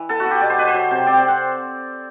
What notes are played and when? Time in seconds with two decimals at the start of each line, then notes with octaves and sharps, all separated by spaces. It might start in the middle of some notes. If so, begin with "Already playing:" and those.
Already playing: E3
0.09 B3 A4
0.20 F#4
0.25 B3
0.31 G4
0.41 B2 D5
0.50 C5
0.58 B2 B4
0.67 C5
0.74 F#3
0.91 C3
1.06 C4 D5
1.18 C4 D5
1.28 F#5